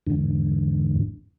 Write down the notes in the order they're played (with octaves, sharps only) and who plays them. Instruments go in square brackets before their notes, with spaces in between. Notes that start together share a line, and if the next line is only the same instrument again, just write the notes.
[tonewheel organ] E2 G#2 D3